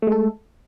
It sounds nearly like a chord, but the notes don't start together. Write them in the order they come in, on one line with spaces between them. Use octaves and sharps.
A3 G#3 A4